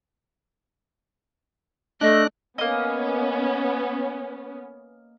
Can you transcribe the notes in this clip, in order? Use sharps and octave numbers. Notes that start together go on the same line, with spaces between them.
A3 D4 D#5 F#6
A#3 B3 C#4 D#5